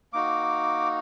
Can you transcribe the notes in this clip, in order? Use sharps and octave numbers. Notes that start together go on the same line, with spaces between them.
A#3 D#4 F#4 D6